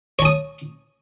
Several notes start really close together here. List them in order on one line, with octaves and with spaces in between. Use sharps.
C#5 A5 D#6